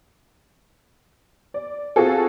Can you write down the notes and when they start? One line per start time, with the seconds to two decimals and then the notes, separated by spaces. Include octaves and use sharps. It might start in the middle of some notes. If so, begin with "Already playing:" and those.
1.54 D5
1.96 C4 F4 F#4 G#4 A4